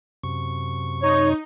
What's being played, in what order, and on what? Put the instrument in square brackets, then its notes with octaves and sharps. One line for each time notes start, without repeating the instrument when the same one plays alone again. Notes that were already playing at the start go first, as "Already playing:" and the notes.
[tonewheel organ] F#2 C3 C#6
[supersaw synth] D#4 [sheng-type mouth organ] C#5